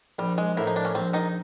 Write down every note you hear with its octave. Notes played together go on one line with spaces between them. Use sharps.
A#1 G3
G#3
A2 F3 A#3 E4
D#4
D4
C#4
A#1 C4
D#3 D#4